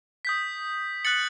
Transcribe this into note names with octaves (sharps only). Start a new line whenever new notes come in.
D#6 G6 B6
F#6 A6 C#7 F#7